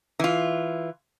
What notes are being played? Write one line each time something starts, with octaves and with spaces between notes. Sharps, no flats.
E3 F4